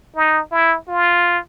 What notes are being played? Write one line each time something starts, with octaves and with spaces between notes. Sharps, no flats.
D#4
E4
F4